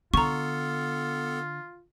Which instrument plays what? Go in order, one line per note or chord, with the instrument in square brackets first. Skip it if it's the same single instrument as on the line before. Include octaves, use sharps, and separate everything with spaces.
[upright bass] D3 [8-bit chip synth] B3 A4 [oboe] F4 [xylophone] A#5 C#6